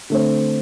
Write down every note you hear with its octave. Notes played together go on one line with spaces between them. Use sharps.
D3 A3 C4